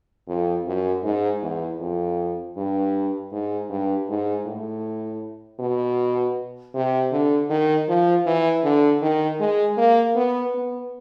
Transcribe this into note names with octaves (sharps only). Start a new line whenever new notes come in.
F2
F#2
G#2
E2
F2
G2
G#2
G2
G#2
A2
B2
C3
D3
D#3
F3
E3
D3
D#3
G#3
A#3
B3
B3